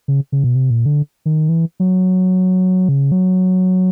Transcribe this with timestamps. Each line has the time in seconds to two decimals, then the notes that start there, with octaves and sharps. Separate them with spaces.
0.08 C#3
0.32 C#3
0.44 B2
0.55 C3
0.70 A#2
0.86 D3
1.26 D#3
1.49 E3
1.80 F#3
2.89 C#3
3.12 F#3